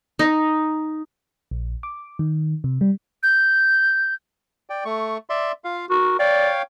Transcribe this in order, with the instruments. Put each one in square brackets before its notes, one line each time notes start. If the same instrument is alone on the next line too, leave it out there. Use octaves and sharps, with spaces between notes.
[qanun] D#4
[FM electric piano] A#1
D6
D#3
C3
G3
[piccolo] G6
[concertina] D5 G5
A3 C#6
D5 E5 C6
F4 F5
[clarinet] F#4 [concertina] A#4
[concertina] C#5 F5 G5 [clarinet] D5